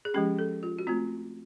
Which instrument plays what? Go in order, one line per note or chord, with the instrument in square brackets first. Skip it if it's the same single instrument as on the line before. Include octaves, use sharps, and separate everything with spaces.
[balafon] G#4
F3 G#3 C#4 G4
A4
F4
F#4
A3 C4 F4